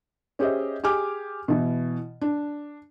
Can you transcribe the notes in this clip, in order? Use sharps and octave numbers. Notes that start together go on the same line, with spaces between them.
C#4 G4 G#4 C5 D#5 E5
G4 G#4 G#5 D6 F6
B2 E3
D4